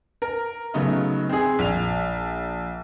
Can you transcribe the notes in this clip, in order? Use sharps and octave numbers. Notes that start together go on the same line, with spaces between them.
A#4
C#3 F#3 A3 B3 D#4
C4 G#4
A#1 F7